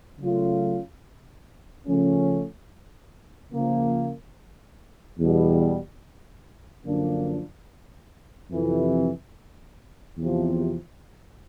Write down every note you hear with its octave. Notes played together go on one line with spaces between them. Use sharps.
C#3 F#3 A3 C#4 F4
C#3 F3 A3 C#4
C#3 F3 A#3
E2 B2 G3
F#2 D3 F3 A#3 D4
F2 C3 E3
E2 C3 F3